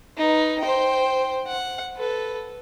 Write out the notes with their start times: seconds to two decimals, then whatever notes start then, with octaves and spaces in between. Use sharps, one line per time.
0.18 D#4 B4
0.60 C5 G5
1.47 F#5
1.96 A4 B4